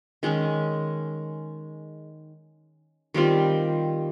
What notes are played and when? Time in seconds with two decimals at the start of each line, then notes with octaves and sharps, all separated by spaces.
0.23 D#3 G#3 C#4
3.14 D#3 G3 C4 F4